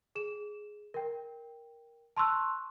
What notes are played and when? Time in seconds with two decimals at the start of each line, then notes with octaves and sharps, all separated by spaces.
0.15 G#4 E7
0.94 A#4 G5
2.17 A5 C6 C#6 E6 F#6